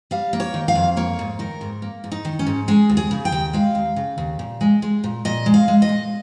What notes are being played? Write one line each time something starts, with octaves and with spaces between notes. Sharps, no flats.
G3 F5
A#3
C#5
D#3
F5
F2
A#3 C#5
G#2
D#3 A#4
G#2
A#3
G#2
D#4
D#3
C#4
G#2
G#3 G#4
D#2
G#4
C#3
G5
D#2
G#3 F5
D#2
C#3
D#2
A#2
G#3
G#3
A#2
A#2 D#5
G#3
F5
G#3
D#5
A#2